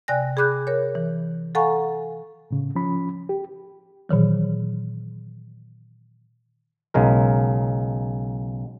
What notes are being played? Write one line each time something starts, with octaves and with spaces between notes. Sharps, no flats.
C3 D5 G5 G#5 F#6 A#6
G#4 B5 D6 F#6 G6
A#4 C#5
E3
A4 F5 F#5 G#5 A#5 C#6
A2 C#3
F3 C#4 B5
G4
A#2 D#3 E3 F#3
B1 C#3 G#3 A#4